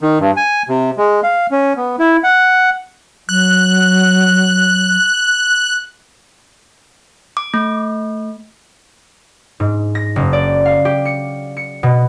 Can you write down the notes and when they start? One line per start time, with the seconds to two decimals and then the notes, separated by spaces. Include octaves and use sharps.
0.01 D#3
0.20 G2
0.36 G#5
0.68 C3
0.97 G#3
1.23 F5
1.51 C#4
1.76 B3
1.99 E4
2.24 F#5
3.29 F#3 F#6
7.37 D6
7.54 A3
9.60 G#2
9.95 A#6
10.16 F#1
10.33 D5
10.66 F5
10.85 G4
11.05 C#7
11.57 C#7
11.83 B2